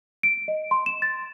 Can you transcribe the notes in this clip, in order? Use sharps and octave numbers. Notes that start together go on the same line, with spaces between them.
D7
D#5
C6
E7
A6